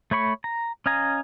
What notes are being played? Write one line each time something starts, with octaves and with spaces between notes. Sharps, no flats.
A3 C#5 B5 C#6
A#5
C#4 D#5 F5 G#5 A#5